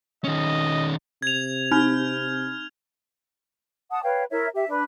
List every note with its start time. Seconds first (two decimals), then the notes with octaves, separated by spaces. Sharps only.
0.24 D#3 C#4 D#5
1.22 C3 G#6 F7
1.71 C4 D#4 F6 G6
3.91 F#5 A5 D#6
4.03 B4 C#5 F5 G5
4.30 E4 A#4 C#5 E5
4.54 G4 E5
4.68 D4 B4